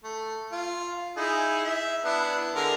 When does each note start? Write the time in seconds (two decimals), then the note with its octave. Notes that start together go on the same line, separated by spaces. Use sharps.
0.04 A3
0.51 F4
1.17 D#4 E4 G#4
1.65 E5
2.04 B3 D4 E4
2.55 D3 G#3 A#4